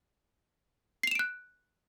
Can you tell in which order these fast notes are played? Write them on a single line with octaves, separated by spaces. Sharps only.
C7 F7 E7 D7 F#6